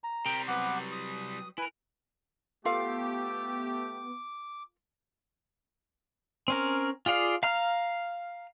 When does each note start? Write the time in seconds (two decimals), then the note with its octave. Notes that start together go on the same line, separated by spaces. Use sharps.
0.04 A#5
0.26 C3 G3 A#4 G5
0.48 F#3 B3 B4 F#5 D6
0.92 D#6
1.58 E4 A#4 B4 G#5
2.65 A3 B3 F4 G4 A4 F5 D6
6.48 C4 C#4 A#4
7.06 F4 G#4 D5 F5
7.43 F5 A#5 F6